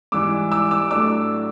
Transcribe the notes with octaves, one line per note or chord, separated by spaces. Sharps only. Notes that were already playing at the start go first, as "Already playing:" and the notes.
G#2 E3 G3 D6 E6
D6 E6
D6 E6
A2 F#3 A3 D4 D6 E6